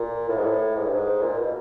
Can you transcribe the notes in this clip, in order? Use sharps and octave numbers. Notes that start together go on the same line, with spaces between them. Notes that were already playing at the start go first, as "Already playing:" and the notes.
Already playing: A#2
A2
G#2
A2
G#2
G2
G#2
A#2
B2